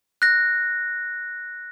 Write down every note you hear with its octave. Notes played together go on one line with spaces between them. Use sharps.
F#6 A#6